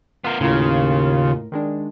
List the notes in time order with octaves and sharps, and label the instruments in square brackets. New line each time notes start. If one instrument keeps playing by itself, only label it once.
[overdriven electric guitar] B3 A#4 [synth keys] F4
[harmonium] D#2 F4 [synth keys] A2 A#4 [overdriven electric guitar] C#3
[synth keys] D#3 G#3 D4